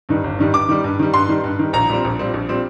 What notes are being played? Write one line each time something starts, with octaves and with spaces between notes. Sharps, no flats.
G2 D#3 G3
G1
G2 D#3 G3
G2 D6
D#3 G3
G2
D#3 G3
G2 C6
D#3 G3
G2
D#3 G3
A#1 A#5
A#2 G3 C4
A#1
A#2 G3 C4
A#1
A#2 G3 C4